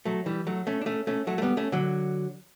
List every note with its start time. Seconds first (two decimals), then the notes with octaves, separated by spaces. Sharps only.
0.05 F#3 A3
0.26 E3 G3
0.47 F#3 A3
0.67 A3 C#4
0.81 D4
0.86 A3 C#4
1.07 A3 C#4
1.27 F#3 A3
1.38 A3
1.42 G3 B3
1.57 A3 C#4
1.72 D3 F#3